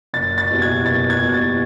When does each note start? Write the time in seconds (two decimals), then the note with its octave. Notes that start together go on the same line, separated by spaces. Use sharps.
0.14 F#1 A6
0.38 A6
0.50 E2 B2 G3
0.62 G#6
0.85 F#1 A6
1.10 G#6
1.22 E2 B2 G3
1.34 A6